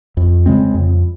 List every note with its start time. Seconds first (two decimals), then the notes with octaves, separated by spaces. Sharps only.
0.17 F2
0.46 C#3 G#3 C4
0.74 F2